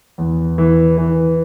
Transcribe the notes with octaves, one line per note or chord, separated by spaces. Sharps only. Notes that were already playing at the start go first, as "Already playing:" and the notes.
E2
E3
E3